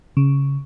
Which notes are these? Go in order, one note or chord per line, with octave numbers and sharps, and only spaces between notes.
C#3